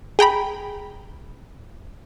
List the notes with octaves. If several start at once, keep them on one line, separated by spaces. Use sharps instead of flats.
G#4 G5 A#5 B5